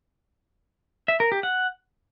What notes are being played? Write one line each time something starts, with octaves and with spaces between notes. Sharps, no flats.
E5
A#4
G4
F#5